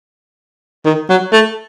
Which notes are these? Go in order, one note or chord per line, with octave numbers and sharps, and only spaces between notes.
D#3
F#3
A3